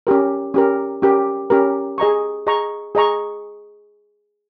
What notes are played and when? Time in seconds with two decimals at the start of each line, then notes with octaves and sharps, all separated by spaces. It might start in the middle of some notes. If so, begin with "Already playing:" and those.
0.07 C#4 G4 A#4
0.54 C#4 G4 A#4
1.02 C#4 G4 A#4
1.50 C#4 G4 A#4
1.98 G#4 D#5 A#5 C#6
2.47 G#4 D#5 A#5 C#6
2.95 G#4 D#5 A#5 C#6